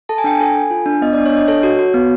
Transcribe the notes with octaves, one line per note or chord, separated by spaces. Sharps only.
A4 A5
G#5
D4 G5
A4 G#5
A4
F4
D4
B3 D#5
D4 D5
C#5
D4 D#5
A4 C#5
F#4
F#4
B3